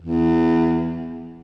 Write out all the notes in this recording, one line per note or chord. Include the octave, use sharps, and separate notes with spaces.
E2